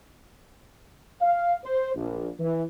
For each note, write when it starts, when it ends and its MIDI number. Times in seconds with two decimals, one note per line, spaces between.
1.20 1.55 77
1.64 1.94 72
1.95 2.28 34
2.39 2.64 52